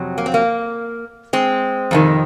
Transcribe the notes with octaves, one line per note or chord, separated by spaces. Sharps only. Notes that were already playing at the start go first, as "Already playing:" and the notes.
Already playing: F2 C3 F#3
A#3
C4
A#3
G#3 C4
F2 C3 D#3